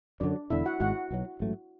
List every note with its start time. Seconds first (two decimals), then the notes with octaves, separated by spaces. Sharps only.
0.20 F#2 D3 F#3 D4 D5
0.50 E1 E2 D3 E4 E5
0.65 F#4 F#5
0.80 G#1 G#2 G#3 F#4 F#5
1.11 B1 B2 F#3
1.40 A1 G#2 F#3 A3